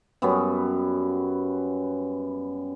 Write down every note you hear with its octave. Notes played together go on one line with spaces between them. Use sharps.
F#2 G3 B3 C#4